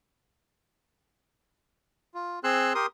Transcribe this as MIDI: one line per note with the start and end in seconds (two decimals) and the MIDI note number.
2.14 2.39 65
2.44 2.73 60
2.44 2.73 68
2.44 2.73 84
2.44 2.73 88
2.44 2.73 90
2.75 2.86 67
2.75 2.86 70
2.75 2.86 84
2.75 2.86 87